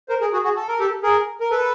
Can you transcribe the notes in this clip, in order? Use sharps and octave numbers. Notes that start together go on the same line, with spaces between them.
A#4 C5
G#4 A#4
F#4 G#4
F#4 G#4
A4
A#4
G4 A4
G#4 A#4
A#4
A4 B4